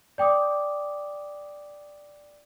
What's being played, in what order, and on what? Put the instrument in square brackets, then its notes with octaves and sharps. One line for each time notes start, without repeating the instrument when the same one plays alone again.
[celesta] D5 G5 D6 D#6